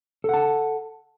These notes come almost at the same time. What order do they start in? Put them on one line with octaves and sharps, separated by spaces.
A4 F#5 A5